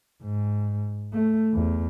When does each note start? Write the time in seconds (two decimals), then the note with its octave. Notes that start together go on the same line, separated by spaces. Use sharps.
0.23 G#2
1.13 A3
1.54 E2